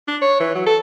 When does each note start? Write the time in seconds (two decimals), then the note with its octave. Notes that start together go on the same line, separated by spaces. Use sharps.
0.08 D4
0.22 C#5
0.40 E3
0.55 F#3
0.66 A4